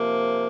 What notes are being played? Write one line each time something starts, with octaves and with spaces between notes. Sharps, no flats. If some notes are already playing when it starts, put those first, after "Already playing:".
Already playing: C3 F3 A#3